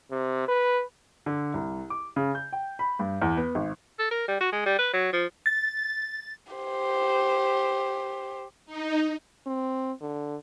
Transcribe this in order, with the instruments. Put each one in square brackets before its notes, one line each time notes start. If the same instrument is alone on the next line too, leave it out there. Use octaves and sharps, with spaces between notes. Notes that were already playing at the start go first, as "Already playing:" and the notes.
[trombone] C3
B4
[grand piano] D3
C2
D6
C#3
G6
G5
B5
G2
E2
B3
G#1
[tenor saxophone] A4
A#4
G3
F#4
G#3
G3
B4
F#3
F3
[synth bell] A6
[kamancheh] G4 C5
[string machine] D#4
[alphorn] C4
D3